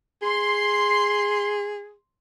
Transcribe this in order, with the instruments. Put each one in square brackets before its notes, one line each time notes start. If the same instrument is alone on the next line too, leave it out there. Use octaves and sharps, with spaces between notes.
[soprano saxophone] G#4 [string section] C6